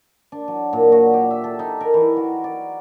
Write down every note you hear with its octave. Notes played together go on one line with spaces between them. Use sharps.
D4
F#3
A#2
F#4
G4
E5
A4
D#4
A#4
E3
F#4
D5